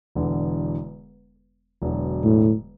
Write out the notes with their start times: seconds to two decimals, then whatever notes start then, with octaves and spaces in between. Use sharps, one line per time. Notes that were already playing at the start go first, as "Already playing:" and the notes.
0.15 E1 E2 D3
1.82 E1 E2 D3 F#3
2.24 A2